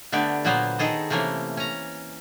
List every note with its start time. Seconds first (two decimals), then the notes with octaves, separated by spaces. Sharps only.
0.12 D3 A3 B3 G4 D5
0.45 A#2 F#3 A#3 B3 C5
0.79 D#3 G#4 A4 D#5
1.10 C3 E3 A3 A#3 C#4
1.57 C#4 A#5